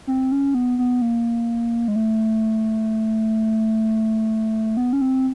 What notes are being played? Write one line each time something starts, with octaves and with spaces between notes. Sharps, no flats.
C4
C#4
B3
B3
A#3
G#3
A3
B3
C#4
C4